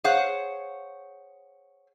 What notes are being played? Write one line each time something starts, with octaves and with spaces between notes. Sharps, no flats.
G#4 C5 C#5 F5 F#5